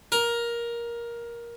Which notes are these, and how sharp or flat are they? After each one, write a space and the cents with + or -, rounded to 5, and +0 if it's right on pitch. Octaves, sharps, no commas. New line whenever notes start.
A#4 +10